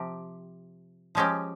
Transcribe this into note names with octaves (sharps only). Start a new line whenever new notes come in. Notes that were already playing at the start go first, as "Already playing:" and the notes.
Already playing: C3 F3 C4 G4
F3 G#3 C#4 G4